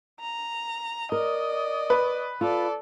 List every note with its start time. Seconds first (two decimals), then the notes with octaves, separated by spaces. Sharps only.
0.20 A#5
1.12 A#4 D5 D#5
1.90 B4
2.41 F4 A4 D5